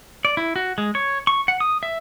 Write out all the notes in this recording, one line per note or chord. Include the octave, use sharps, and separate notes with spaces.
D5
E4
F#4
G#3
C#5
C#6
F#5
D#6
E5